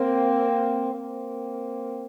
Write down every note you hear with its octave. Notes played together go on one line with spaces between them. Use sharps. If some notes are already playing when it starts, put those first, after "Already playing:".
Already playing: A#3 C4
A#3 C4